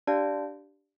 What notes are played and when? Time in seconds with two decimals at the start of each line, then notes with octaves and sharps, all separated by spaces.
0.07 D4 G4 D5 F5 A5